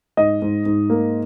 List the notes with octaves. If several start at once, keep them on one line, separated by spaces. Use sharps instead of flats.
G#2 D#5
G#2
G#2
A#3